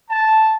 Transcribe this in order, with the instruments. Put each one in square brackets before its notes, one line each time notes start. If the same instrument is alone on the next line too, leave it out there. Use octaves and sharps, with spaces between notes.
[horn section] A5